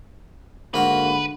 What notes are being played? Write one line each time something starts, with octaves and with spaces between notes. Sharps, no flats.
G#2 D3 A#3 F#4 B4 F5 F#5